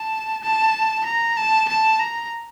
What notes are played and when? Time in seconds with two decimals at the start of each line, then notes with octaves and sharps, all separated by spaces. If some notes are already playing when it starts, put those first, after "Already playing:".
Already playing: A5
0.43 A5
1.05 A#5
1.37 A5
1.69 A5
2.00 A#5